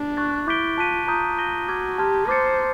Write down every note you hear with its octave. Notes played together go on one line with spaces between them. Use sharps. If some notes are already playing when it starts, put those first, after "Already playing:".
Already playing: D4
C#6 F#6 A6
E4 D6 G6 B6 D7 G7
F4 A5 D6 F#6 B6 D#7
F4 A#5 D#6 G6
G6 A#6 D#7 G7
F#4 D6 F6 G#6
G4 A5 C6 F6 G#6
C5 D6 F6 A6 C#7